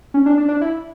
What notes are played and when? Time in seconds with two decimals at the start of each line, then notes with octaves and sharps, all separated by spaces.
0.14 C#4
0.26 D4
0.38 D4
0.48 D4
0.61 E4